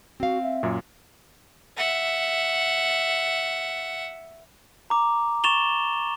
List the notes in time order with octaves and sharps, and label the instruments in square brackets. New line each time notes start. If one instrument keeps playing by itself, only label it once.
[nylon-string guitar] C4 F5 [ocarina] F#4
[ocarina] E5
[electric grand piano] F#2 A#2
[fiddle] E5 F#5
[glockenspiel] A#5 D6
C#6 A6 E7 F7 G7